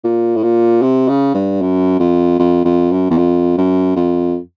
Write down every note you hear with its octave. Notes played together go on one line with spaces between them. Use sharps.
A#2
A2
A#2
C3
C#3
G2
F#2
F2
F2
F2
F#2
E2
F2
F#2
F2